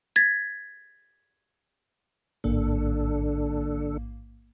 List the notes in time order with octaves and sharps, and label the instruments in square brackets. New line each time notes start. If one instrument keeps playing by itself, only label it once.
[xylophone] G#6 A6 B6
[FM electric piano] A1 G#2 A#3 [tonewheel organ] D3 D4 A4